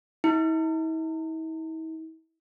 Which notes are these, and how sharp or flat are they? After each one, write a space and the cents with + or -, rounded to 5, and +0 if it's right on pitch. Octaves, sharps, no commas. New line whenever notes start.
E4 -45